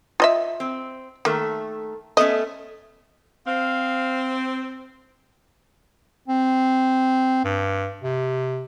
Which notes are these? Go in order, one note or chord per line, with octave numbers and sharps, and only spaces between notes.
F4 D#5 E5
C4
D#3 A3 A#3
A3 B3 C#4 D#5
C4 F5
C4
G2
C3